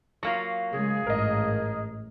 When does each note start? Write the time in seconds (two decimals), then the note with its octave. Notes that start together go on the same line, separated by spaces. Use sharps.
0.23 F#3 A#3 F4 C#6
0.72 C#3 G#3 G#4
1.07 A1 G#2 A#4 D#5